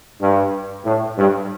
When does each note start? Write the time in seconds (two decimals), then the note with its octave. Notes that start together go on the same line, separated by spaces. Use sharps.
0.22 G2
0.86 A2
1.18 G2